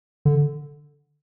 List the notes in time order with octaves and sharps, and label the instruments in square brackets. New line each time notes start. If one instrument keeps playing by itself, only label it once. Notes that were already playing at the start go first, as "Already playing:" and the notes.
[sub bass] D3